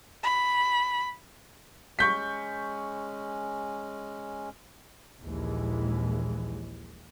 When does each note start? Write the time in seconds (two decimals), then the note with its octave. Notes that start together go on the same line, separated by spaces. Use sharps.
0.24 B5
1.99 G#3 C#4 C#6 G6 B6
5.21 A#1 D#2 E3 G#3